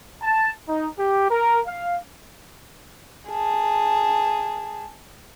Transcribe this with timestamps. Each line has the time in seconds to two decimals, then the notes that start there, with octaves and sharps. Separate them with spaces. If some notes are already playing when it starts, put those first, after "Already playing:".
0.22 A5
0.68 D#4
0.97 G4
1.31 A#4
1.66 F5
3.29 G#4 A5